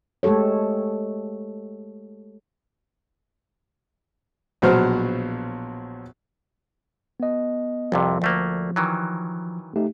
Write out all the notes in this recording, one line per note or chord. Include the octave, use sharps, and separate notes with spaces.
G#3 A3 G4 A4 C#5
A#1 B2 F#3 C5 F6
B3 D#5
C2 F2 C3 F3
D2 A3 A#3
D#3 E3 F#3
A3 D#4 G4